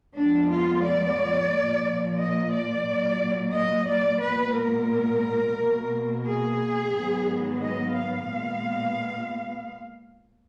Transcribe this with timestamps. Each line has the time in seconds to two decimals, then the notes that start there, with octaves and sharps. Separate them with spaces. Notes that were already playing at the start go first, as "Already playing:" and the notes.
0.17 F2 F3 G#3 B3 D4
0.51 F4
0.85 D5
1.52 A#2 F3 A#3
2.20 D#5
2.53 D5
2.87 A#2 F#3 A#3
3.55 D#5
3.89 D5
4.23 A#2 G#3 B3 B4
4.57 A#4
5.58 B2 A#3
6.26 G#4
6.94 G#2 D#3 F#3 B3
7.61 D#5
7.95 F5
8.29 A#2 G#3 B3